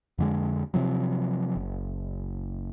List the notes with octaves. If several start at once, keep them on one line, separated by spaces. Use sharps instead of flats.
F2 D3 G#3
C3 F3 F#3
F#1